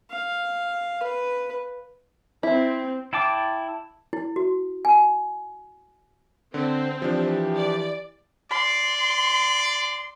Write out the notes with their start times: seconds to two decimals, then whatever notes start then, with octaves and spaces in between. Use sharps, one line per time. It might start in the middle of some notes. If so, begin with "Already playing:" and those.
0.10 F5
1.03 B4
2.43 C4 E4
3.13 E4 G5 A5 D6
4.13 E4
4.36 F#4
4.85 G#5
6.54 D3 C4
7.02 E3 F3 D4 G4
7.55 D5
8.51 D5 C6